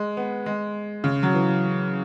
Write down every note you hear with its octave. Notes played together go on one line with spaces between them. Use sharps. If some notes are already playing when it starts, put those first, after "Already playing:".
Already playing: G#3
B3
G#3
C#3
F#3
E3